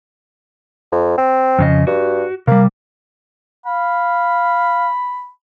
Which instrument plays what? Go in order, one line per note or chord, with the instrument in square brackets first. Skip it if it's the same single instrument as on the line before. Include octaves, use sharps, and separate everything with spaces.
[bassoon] F2
C4
[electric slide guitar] F2 C#3 D#5
[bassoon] G2 [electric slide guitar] F#4
[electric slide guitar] C3 G3 [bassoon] A#3
[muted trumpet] F5 [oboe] B5